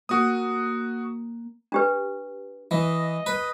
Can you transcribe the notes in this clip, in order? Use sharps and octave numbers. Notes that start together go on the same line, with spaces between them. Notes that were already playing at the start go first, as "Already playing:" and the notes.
A#3 F#4 D#6
D4 G4 B4
E3 D#5
B4